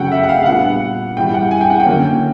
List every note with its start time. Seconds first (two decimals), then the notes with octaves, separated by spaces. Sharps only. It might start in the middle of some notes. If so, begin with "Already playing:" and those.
Already playing: C#3 F#3 A3 F#5 G5
0.12 E5
0.23 F#5
0.29 F5
0.42 F5
0.46 A#2 G3 B3 D4 F#5
1.17 A2 E3 G3 G5
1.34 F#5
1.51 G#5
1.61 G5
1.70 F#5
1.80 G5
1.85 D3 F#3 A#3 C#4